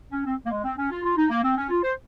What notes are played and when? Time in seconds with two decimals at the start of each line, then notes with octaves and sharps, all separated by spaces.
0.12 C#4
0.26 C4
0.46 A#3
0.51 G#3
0.64 C4
0.78 C#4
0.91 F4
1.04 F4
1.17 D#4
1.30 A#3
1.43 C4
1.57 C#4
1.70 F4
1.83 C5